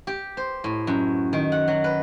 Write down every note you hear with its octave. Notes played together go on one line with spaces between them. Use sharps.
G4
C5
A2
F#2
D#3
F#5
F#3
B4